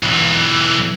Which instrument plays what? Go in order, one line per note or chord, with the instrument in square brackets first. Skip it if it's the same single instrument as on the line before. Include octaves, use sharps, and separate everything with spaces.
[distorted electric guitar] B1 E3